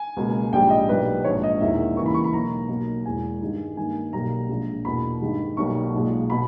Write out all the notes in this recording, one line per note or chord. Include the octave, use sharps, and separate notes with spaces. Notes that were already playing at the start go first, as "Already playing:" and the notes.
Already playing: G#5
C#2 B2 A#3
A#1 G#2 G3 G5
D#5
B1 B2 G3 A#3 B4
A#1 G#2 D#3 C#5
D#5
E1 E2 D#3 A#3 E5
D#2 C#3 E3 A#3 C#6
B5
C#6
B5
B1 B2 A#3 A#5
B1 B2 A#3
E1 E2 B2 G#5
G2 D#3 G#3
G2 D#3 A#3 G#5
B1 B2 G3 A#3 A#5
A#1 A#2 G#3
E2 B2 A#3 B5
G2 D#3 G#3
B1 B2 G3 A#3 C#6
B1 A#2 G#3
B2 B5